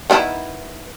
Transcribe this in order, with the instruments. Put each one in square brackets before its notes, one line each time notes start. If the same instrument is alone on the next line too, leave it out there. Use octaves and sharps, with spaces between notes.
[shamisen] D#3 B3 E4